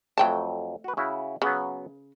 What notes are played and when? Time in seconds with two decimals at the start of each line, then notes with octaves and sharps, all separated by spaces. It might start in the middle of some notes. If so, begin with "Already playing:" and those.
0.18 F2 F#3 A3 G5 A5
0.84 F#4 B4
0.97 C#3 E4 F#4
1.42 C#3 F#3 B3 C#4